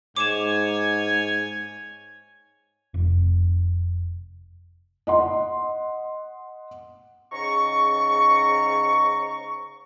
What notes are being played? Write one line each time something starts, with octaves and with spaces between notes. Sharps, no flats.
G#2 C#5 G#5 D6 E7
F1
D#5 F#5 C6
G#2 C#3 A#5 C#6